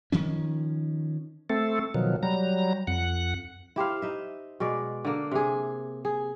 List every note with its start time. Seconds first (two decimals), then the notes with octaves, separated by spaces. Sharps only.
0.12 D#3 F3 C#4
1.50 A3 C4 A4
1.94 B2 D#3 F3 F#3
2.23 F#3 G3 A#5
2.87 F2 F#5
3.76 E4 G4 C5 F5
4.02 D#4 E5
4.60 B2 G#3 D5
5.05 D3 A#3
5.32 C3 G#4
6.05 G#4